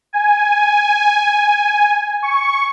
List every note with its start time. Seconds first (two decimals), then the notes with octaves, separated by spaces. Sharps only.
0.13 G#5
2.23 C#6